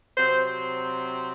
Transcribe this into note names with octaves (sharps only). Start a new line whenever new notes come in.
C3 F#3 C4 C5